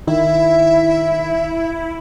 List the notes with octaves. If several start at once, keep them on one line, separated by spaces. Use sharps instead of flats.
D#3 E4 E5